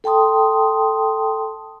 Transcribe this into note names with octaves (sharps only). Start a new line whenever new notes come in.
A4 G5 A5 C6 D#6